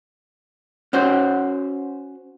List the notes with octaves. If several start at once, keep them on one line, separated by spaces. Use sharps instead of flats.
C#4 F#4 C5